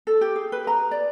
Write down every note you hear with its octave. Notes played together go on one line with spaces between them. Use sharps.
A4
G4
G#4
B4
A#5
D5